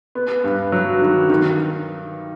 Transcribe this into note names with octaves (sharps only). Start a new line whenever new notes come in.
B3
G2
F#3
D#3
D#3